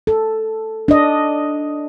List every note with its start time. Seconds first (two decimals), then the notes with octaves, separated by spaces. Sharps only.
0.07 A4
0.88 D4 D#5